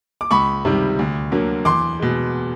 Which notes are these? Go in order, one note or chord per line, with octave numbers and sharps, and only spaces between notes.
D6
C#2 B5 C#6
C3 D#3 G3
D2
D3 F#3 A#3
E2 C6 D6
B2 G#3